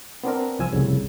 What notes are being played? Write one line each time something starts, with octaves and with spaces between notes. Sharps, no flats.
B3 C4 D4 A#4
C2 F3 G#5 E6
C2 F2 A2 C#3